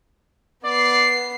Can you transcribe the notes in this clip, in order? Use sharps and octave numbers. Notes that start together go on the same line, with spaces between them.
B3 D5 C7